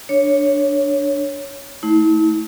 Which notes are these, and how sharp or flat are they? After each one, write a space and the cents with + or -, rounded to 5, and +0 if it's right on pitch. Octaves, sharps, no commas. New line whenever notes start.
D4 +0 C#5 +0
A3 +0 E4 -45